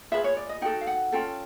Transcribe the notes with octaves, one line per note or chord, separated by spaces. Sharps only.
F4 G#4 B4 E5
C#5
D5
D#5
D#4 F#4 A4 G5
F5
F#5
C#4 F4 A4 G5